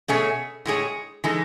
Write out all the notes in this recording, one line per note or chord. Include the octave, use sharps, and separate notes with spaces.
B2 A3 C#4 G#4 C#5
A2 G#3 D#4 G#4 C#5
E3 G#3 D#4 A4